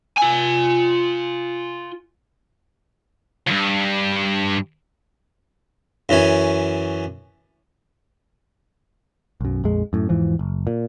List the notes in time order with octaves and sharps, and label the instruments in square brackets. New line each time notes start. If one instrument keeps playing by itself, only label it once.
[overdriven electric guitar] F4 G#5
[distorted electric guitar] C#2 G2
[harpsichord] F#2 E3 C#4 G#5
[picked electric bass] B1 F#2
A#1 F2 G#3
F#2 A2
E2 G#2 E3 F3
F#1
A#2